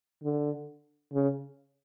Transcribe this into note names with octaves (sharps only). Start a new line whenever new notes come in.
D3
C#3